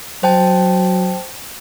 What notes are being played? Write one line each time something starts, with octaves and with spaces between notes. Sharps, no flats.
F#3 C5 G5 A5